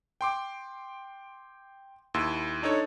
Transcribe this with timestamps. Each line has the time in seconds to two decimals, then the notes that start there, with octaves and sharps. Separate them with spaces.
0.21 G5 C6 D6
2.14 D#2 E4 C6 E6
2.63 D4 D#4 A4 C#5